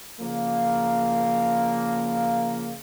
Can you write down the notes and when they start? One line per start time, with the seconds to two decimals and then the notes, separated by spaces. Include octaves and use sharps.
0.20 C#3 F3 A#3